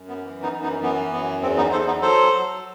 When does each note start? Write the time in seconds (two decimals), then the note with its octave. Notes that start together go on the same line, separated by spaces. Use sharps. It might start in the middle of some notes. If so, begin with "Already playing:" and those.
Already playing: F#2
0.09 B3
0.23 E3
0.42 B3 D#4
0.52 F#2
0.63 B3 D#4
0.83 E3 B3
1.12 F#2 B3
1.42 E2 C4
1.57 B3 D#4
1.72 E2 A4 C5
1.87 B3 D#4
2.02 F#3 A4 C5
2.33 F#3